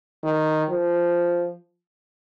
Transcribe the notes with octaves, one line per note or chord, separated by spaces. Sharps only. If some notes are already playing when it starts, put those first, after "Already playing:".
D#3
F3